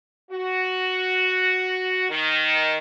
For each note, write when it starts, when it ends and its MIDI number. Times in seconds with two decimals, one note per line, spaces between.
0.31 2.08 66
2.10 2.77 51